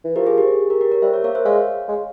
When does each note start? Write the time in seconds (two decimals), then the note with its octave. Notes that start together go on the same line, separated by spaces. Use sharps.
0.04 E3
0.16 F3 G4 A#4
0.27 G#4
0.38 G4
0.48 G#4
0.70 G4 A#4
0.81 G4 A#4
0.92 A#4 C#5
1.02 G3 C5 E5
1.13 A#4 C#5
1.24 A#3 A#4 C#5
1.35 C5 E5
1.45 G#3 C#5 F5
1.89 G#3